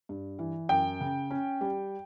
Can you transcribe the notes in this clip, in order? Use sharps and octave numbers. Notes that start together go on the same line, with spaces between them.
G2
E3
F#2 G5
C#3
C#4
G3